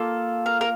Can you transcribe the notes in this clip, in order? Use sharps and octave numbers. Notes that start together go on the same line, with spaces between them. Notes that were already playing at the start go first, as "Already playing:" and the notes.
Already playing: A#3 F4 A4
A#4
A#4